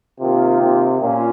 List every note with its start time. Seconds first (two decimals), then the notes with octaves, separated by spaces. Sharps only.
0.20 C3 D#3 A#3 F4
0.60 C3
1.01 A#2 C#4 F4